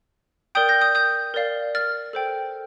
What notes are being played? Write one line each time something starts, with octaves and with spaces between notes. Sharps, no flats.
A#4 D5 G5 D#6 G6
G6 A#6
D#6 G6
D#6 G6
A#4 D5 F5
F6 A6
A4 C5 G5